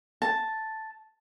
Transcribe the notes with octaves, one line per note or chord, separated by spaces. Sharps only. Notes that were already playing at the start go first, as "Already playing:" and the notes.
A5